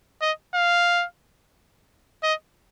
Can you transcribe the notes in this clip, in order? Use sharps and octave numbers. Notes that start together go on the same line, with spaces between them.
D#5
F5
D#5